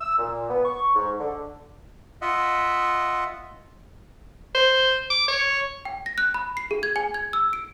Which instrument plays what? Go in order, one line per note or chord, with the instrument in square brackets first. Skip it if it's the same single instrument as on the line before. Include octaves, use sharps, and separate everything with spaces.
[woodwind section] E6
A#2
B3
C#6
G#2
D3
[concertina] F4 D#5 E5 F#5
[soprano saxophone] C5
D6
C#5
[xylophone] G5
A#6
F#6
B5
C7
G#4
G#6
G#5
G#6
E6
D7